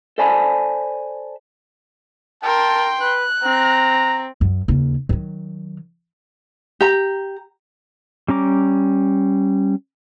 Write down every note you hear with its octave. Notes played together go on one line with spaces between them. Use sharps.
A4 C5 D5 G#5 A5 B5
A#4 G5 A5 C6
B4 F#6
C4 A#5
F#2
D#2 C#3
D#3 F#3
G4 A#5
G3 C#4 A#5 D6